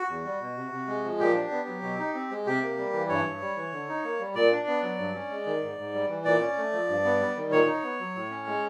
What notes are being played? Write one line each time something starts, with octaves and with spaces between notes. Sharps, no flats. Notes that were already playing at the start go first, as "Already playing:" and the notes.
Already playing: F#4
E2
G3
B2
C3
C3
G#3
F3
A#2 G4
D4
B3
F#3
B2
D#4
C4
G#3
C3 G4
A#3
G3
E3
G2 C#5
G2
G3
E3
D3
D#4
A#3
G3
A#2 D5
D4
B3
F#3
G2
C#4
G#3
D#3
G#2
G#2
G3
E3
A#2 D5
C#4
A3
F3
G2
B3
G3
D#3
A#2 C#5
D#4
B3
F#3
A2
C#4
G#3